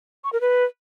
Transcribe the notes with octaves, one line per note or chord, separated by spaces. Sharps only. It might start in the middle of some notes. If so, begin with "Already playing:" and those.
C#6
A#4
B4